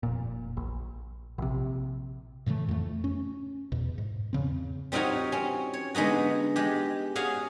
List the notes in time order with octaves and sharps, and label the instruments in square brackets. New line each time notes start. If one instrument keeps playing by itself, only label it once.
[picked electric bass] F1 A#2
A#1
A#1 C3
[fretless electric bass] A2 C#3 E3 A3
F2 A3
C#4
E2 B2
G#2
E2 C#3 C4
[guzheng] G3 C4 D#4 F4 F#4 C#5
C4 C#4
C#5
D3 G#3 B3 D#4 F#4
G#3 G4
C#4 F#4 G#4 F5